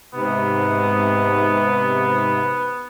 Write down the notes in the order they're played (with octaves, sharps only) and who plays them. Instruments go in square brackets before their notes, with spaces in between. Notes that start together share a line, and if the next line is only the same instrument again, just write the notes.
[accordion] G#2 C3 [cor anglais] B3